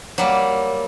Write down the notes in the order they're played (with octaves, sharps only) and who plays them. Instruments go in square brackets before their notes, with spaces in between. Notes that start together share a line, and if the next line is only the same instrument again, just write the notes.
[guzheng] F#3 G3 A#3